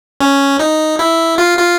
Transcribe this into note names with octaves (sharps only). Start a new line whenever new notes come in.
C#4
D#4
E4
F4
F4